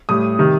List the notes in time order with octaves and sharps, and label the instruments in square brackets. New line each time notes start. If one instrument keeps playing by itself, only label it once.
[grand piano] A2 G3 D#6
C3 D#3 G3